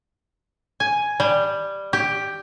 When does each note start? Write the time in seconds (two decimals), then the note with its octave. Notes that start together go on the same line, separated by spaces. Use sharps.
0.80 G#5
1.20 G3
1.93 G4